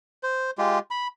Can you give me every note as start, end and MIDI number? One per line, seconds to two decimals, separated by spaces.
0.23 0.51 72
0.58 0.79 56
0.58 0.79 65
0.58 0.79 67
0.91 1.07 83